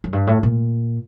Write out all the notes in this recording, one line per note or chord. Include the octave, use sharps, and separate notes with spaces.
F#2
G2
A2
A#2